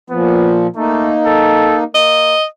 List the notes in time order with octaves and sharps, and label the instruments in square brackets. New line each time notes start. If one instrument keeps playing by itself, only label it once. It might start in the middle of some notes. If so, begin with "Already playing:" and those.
[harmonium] A#2 F3 [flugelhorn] B3
[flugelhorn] A3 [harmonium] A#3 D#4
[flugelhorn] A4
[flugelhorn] A#3 [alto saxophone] D#5